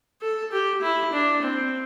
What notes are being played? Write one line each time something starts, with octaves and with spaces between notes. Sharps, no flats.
A4
G4
E4
D4
C4